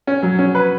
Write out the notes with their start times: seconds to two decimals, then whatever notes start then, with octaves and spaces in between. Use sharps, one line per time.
0.07 C#4
0.23 F#3
0.39 C#4
0.55 B4